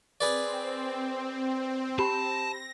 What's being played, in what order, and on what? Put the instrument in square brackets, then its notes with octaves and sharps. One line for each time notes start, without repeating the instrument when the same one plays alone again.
[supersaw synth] C4 [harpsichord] G#4 B4 D5
[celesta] G4 B5 [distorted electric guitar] A5 [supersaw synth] A#6